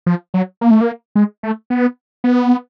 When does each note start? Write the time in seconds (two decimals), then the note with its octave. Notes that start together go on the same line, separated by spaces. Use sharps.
0.06 F3
0.34 F#3
0.61 A#3
0.71 A3
0.81 A#3
1.15 G#3
1.43 A3
1.70 B3
2.24 B3